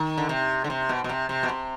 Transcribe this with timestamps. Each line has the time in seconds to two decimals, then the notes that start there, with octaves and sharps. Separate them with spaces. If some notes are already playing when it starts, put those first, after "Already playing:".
Already playing: D#3
0.17 D3
0.29 C3
0.64 D3
0.70 C3
0.89 B2
1.04 B2
1.09 C3
1.29 C3
1.43 B2
1.49 C3